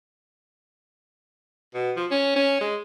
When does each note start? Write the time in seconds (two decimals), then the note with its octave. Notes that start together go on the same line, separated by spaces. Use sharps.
1.74 B2
1.96 F3
2.11 C#4
2.36 C#4
2.61 G#3